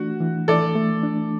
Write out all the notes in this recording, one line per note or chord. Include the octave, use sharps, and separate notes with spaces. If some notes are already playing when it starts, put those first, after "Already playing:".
Already playing: E3 A3 D4 F#4
E3
E3 A4 D5
A3
D4